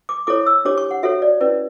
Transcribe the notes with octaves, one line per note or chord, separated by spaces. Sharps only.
D6
E4 A4 C#5 D6
E6
D4 G4 C#5 D6
C#6
F#5
F#4 A4 C#5 E5
D5
C#4 E4 B4 D5